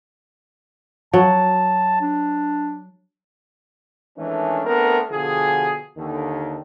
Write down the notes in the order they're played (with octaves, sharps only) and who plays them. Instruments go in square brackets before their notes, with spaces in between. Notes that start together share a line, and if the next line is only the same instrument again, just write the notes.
[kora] F#3 [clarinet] A5
[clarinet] D4
[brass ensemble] D#3 E3 G#3 A3 C#4 D4
A3 B3 C4 D4 A#4
B2 D3 F3 G4 G#4
D#2 D3 D#3